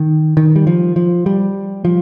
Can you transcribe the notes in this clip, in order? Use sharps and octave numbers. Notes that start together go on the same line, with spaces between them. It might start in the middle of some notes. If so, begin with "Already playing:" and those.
Already playing: D#3
D#3
G3
F3
F3
G3
F3